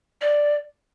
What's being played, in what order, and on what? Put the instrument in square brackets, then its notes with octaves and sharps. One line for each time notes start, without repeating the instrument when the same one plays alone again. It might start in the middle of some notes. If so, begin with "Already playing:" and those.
[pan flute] D5